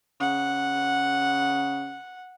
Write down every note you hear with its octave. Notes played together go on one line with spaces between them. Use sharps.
C#3 F#5